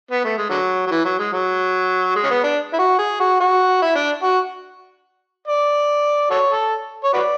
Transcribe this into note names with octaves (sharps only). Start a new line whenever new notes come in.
B3
A3
G#3
D3 F#3
F#3
E3
F#3
G#3
F#3
G#3
C#4
B3
D4
E4
F#4
G#4
F#4
F#4
E4
D4
F#4
D5
F#4 A4 C#5
A4
C#5
F#4 B4 D5